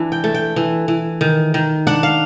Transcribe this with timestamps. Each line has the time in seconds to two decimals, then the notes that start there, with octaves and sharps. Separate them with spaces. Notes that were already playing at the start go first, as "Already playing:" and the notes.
Already playing: E3 D4
0.12 G5
0.24 A3
0.34 G5
0.56 E3
0.88 E3
1.21 D#3
1.54 D#3
1.87 D4 F#5
2.03 F5